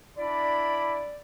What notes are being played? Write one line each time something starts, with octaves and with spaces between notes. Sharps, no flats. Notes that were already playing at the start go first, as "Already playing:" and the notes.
D4 E4 D5 B5